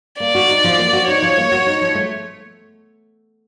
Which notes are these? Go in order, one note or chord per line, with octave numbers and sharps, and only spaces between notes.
A#3 D5
F#4
D#4
F3
A#3
F#4
D#4 C#5
F3
A#3
F#4
D#4
F3
A3